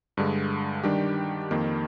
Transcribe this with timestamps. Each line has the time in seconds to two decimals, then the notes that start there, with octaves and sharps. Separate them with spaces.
0.17 G2 D3 G#3
0.84 D#3 G3 D4 G4
1.51 F2 D#3 A#3